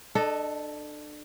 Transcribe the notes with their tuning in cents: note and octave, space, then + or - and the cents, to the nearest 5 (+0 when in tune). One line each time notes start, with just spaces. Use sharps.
D4 +30 A4 +0 D#5 +0